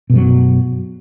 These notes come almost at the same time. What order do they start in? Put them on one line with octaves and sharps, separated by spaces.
B2 F#2 F#3